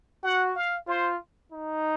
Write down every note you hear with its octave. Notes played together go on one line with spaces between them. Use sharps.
F#4 F#5
F5
F4 C5
D#4